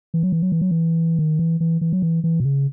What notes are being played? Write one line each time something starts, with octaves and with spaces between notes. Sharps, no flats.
E3
F#3
E3
F#3
E3
F#3
E3
D#3
E3
E3
E3
F#3
E3
E3
B2
C#3